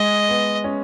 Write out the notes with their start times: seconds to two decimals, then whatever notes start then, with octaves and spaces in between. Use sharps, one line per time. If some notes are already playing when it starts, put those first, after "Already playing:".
Already playing: G#3 D#5
0.29 B3
0.64 C#4